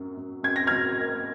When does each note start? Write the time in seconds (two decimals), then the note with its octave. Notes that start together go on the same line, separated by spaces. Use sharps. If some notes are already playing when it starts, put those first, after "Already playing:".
Already playing: F#2 F#3
0.17 F#2
0.43 F#2 G#6
0.56 A#6
0.67 F#3 F6 G#6
0.98 A#3